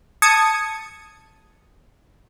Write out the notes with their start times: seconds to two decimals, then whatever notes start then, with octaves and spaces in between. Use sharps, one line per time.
0.22 A5 D#6 G#6 C#7